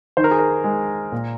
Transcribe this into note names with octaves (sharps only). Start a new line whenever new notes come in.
D#3 C5
A#4
G#4
A#4
G#3
A#2